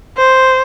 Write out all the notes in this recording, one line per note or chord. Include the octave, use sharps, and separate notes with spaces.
C5